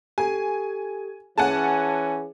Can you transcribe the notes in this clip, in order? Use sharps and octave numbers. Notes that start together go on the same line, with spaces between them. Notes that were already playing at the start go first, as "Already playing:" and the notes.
G4 A4 G#5
E3 C#4 G#4 F#5 G#5 A5